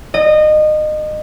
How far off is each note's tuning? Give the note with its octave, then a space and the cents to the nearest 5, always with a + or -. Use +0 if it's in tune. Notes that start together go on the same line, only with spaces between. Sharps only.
D#5 -25